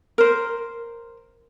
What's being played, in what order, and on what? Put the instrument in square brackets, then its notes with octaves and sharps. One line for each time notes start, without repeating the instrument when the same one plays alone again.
[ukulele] A#4 C5